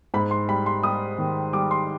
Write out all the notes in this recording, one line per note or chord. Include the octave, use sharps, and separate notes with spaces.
G#2 B5
C6
G3 B5
C6
G3 D#6
D#3
G3 D6
C6